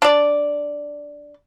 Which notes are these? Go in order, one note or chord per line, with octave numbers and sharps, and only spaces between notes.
D4 D5